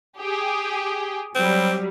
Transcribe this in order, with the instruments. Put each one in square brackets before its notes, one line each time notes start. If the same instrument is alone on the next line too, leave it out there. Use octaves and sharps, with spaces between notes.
[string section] G4 G#4
[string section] F#3 G3 [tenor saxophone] C4